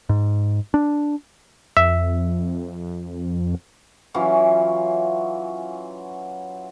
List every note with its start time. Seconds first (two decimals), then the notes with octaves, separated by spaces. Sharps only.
0.09 G#2
0.74 D4
1.77 F2 E5
4.14 E3 F#3 C#4 F4